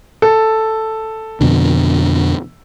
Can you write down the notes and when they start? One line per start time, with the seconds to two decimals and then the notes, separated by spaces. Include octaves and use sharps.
0.22 A4
1.41 F2 B2 D3